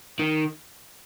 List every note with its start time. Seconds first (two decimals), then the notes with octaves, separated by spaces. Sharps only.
0.19 D#3